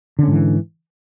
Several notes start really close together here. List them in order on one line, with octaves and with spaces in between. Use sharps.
D3 C#4 G#2 E3